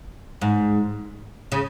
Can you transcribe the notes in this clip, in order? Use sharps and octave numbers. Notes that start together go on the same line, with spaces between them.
G#2
C#3